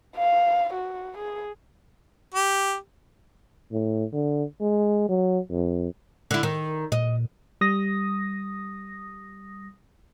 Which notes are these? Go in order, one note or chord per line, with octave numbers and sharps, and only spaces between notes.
F5
F#4
G#4
G4
A2
D3
G#3
F#3
F2
D3 E4
D#3
A#2 D#5
G3 D#6 A#6